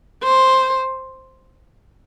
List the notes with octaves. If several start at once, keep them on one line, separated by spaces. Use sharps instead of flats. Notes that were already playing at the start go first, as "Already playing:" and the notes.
C5